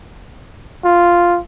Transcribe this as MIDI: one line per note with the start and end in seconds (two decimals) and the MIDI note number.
0.84 1.39 65